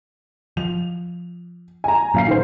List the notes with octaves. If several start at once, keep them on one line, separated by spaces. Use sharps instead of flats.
F3 F7
G#5 A#5
A#2 F#3 F5 C7
D#3 C5